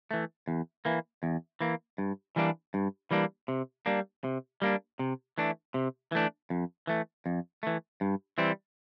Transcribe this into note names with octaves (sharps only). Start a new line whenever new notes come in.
E3 A3
E2
E3 A#3
E2
E3 A#3
G2
E3 G3 A#3 D4
G2
E3 G3 A#3 D4
C3
G3 A#3 D4
C3
G3 A#3 D4
C3
E3 A3 D4
C3
E3 A3 D4
F2
E3 A3
F2
E3 A3
G2
E3 G3 C4